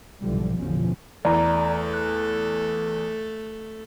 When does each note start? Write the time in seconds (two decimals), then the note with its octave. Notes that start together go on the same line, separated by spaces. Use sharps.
0.21 B1 G#2 D3 E3 F3 G3
0.58 A1 E2 B2 D3 F3 C#4
1.25 E2 A3 A4 D5 A#5
1.94 F#6